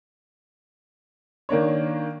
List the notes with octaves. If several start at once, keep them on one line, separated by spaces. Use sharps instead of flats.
D#3 A#3 D4 C#5